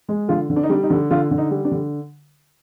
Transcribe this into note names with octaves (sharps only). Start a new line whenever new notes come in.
G#3
D3 F4
D3
D4
D#4
G3 D4
D#4
D3
D3 F4
D3
D#4
G3
D4
D3